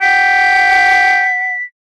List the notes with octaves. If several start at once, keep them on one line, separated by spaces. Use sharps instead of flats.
F#5 G5 B6